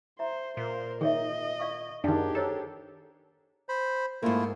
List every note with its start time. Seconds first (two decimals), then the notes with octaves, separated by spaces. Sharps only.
0.19 C5 E5 A#5
0.57 A#2 A#4 C5
1.01 D#3 G#4 C#5 D#5 E5
1.60 D5 F5 C#6
2.04 F#2 D#3 D4 G4 G#4 F5
2.35 A4 C5 C#5 A#5
3.69 C5 B5
4.22 G#2 A3 A#3 E4 F4